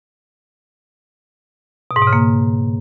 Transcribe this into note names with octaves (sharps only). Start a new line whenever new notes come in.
B2
G#2
B2
C#3
A#3